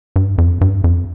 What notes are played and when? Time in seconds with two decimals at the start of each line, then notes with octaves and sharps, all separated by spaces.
0.16 G2
0.38 F2
0.61 G2
0.84 F2